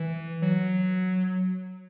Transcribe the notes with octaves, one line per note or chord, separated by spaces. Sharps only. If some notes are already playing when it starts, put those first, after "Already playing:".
Already playing: E3
F#3